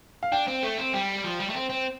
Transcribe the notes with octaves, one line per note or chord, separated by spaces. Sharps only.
F5
D4 G5
C4
A3
C4
G3 G5
F3
G3
A3
C4
C4